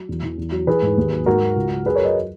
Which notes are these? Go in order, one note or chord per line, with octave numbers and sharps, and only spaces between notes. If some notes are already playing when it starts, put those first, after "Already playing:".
Already playing: F#3
E2
E3
E2
F#3
E3 G#4 B4
G#2
D#2
F#3
G#2 F#4 A#4
F#3
C#2
F#3
F#2 G#4 B4
A#4 C#5
F#3 D#5